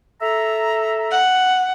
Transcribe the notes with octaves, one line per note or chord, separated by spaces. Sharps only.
A4 E5 A#5
F#5